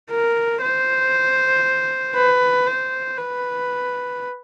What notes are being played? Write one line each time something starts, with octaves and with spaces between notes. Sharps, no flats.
A#4
C5
B4
C5
B4